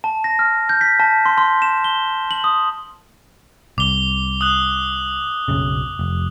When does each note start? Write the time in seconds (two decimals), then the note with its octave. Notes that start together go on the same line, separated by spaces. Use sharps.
0.04 A5
0.24 A#6
0.39 F6
0.69 G6
0.81 B6
1.00 A5
1.26 C6
1.38 C6
1.62 E7
1.84 G7
2.31 F#7
2.44 D#6
3.78 C2 D6 G7
4.41 D#6 F#6
5.48 B1 F#2 C#3
5.99 F1